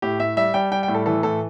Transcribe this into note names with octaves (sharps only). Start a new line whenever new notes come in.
A2 G4
A2 E5
G3 E5
G3 G5
G3 G5
G5
A2
A4
E3 A4
A2 A4